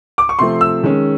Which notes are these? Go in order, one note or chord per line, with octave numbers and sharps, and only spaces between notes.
D6
C#6
C3 F3 A3 C4 C6
E6
D#3 G#3 C#4